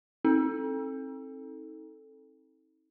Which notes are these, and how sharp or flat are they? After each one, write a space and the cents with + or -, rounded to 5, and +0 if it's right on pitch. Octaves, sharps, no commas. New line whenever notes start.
C4 +35 D#4 +35 A4 +0